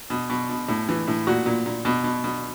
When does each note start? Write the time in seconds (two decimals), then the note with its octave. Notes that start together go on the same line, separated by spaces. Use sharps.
0.10 B2
0.29 B2
0.49 B2
0.68 A2
0.89 E3
1.07 A2
1.27 A#2 F#4
1.46 A#2
1.66 A#2
1.85 B2
2.04 B2
2.24 B2